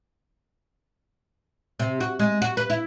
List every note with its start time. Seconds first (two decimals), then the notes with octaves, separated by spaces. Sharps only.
1.80 C3
2.00 F#4
2.19 G#3
2.42 F#4
2.57 B4
2.70 E4